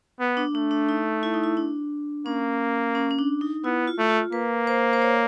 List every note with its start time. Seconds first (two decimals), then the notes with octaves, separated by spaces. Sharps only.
0.20 B3
0.37 D4
0.54 A3 D4
0.71 D4
0.89 D#4
1.23 E4
1.34 D#4
1.43 E4
1.57 D4
2.26 A#3 C#4
2.95 C#4
3.11 C#4
3.19 D4
3.41 D#4
3.64 B3 E4
3.87 F4
3.99 A3
4.09 F4
4.32 A#3 B4
4.67 C5
4.93 C5
5.02 C#5